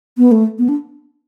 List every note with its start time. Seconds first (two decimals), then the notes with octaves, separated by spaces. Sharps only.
0.18 B3
0.32 A3
0.59 B3
0.69 D4